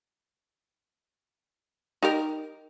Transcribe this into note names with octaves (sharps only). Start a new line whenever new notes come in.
D#4 G4 A#4